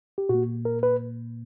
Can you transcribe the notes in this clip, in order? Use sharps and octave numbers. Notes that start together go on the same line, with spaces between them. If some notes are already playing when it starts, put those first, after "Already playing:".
G4
A#2 A#3 F#4
A#4
B4